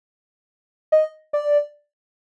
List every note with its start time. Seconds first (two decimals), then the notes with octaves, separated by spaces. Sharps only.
0.92 D#5
1.33 D5